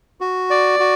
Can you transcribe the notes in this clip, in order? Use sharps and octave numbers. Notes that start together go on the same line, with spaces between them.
F#4
D5
F#4